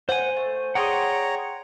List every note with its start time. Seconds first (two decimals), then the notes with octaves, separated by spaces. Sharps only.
0.09 C5 F#5 G#5
0.37 A3
0.75 G#4 C#5 D5 F#5 G5 A#5 C6 D#6